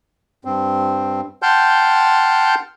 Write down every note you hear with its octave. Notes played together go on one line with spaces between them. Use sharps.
G2 C4
F#5 G5 A5 C6 F6 G6